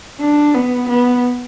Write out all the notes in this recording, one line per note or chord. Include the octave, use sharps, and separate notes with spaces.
D4
B3
B3